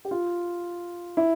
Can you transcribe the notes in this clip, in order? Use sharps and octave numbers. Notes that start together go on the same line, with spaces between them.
G4
F4
E4